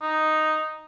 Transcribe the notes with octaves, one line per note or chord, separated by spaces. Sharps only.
D#4